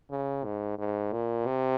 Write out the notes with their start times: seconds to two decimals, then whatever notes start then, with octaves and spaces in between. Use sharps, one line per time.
0.11 C#3
0.45 G#2
0.78 G#2
1.12 A#2
1.46 C3